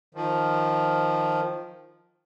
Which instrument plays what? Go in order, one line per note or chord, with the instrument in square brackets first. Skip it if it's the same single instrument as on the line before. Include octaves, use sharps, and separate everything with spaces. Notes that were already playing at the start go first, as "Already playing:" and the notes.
[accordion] D#3 F3